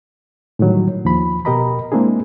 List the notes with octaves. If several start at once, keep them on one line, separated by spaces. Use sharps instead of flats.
A2 D3 D#3 F#3 G3
D#2 F3 B5
B2 G4 A#4 D#5 A#5 B5
G#3 A#3 C4 D4 E4 G#4